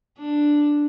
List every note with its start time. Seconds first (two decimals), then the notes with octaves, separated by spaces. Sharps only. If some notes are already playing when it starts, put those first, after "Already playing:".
0.19 D4